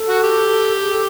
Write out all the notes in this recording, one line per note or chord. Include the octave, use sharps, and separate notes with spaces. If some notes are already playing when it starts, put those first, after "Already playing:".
Already playing: A4
F#4
G4
G#4
A4